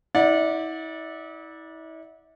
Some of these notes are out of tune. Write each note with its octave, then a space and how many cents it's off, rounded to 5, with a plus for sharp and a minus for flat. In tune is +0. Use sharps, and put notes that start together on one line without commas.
E4 -40 D5 +0 F#5 -30